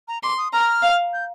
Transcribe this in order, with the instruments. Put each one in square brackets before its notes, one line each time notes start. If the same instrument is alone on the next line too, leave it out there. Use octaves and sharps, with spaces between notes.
[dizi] A#5
[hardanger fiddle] C6 [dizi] D6
[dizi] D#6
[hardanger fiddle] A#5 [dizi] F6
[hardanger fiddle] F5
[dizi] G6